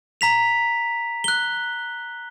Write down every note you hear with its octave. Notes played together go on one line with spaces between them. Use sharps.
A#5 B6 F7
F#6 G7